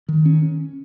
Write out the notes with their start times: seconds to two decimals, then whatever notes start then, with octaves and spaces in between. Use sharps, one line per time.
0.09 D#3
0.26 C#4